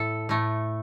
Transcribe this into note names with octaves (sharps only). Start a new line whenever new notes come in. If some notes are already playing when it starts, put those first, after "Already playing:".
Already playing: A2 A4
A2 A3